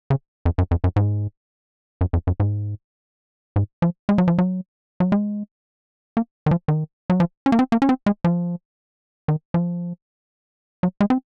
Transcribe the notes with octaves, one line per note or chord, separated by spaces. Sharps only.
C#3
F2
F#2
F2
F#2
G#2
F#2
F2
F#2
G#2
G#2
F3
G#3
F#3
F3
F#3
F#3
G#3
A#3
D#3
F3
D#3
F#3
F3
C#4
A#3
C4
A#3
C#4
C4
G#3
F3
D#3
F3
F#3
G#3
C4